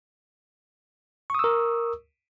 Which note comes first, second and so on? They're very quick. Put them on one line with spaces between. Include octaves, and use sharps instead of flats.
C#6 D#6 E6 A#4